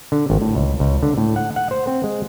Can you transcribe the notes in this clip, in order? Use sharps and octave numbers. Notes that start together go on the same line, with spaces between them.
D3
G#1
A2
C#2
C#2
D3
A2
F#5
F#5
C5
C4
G#3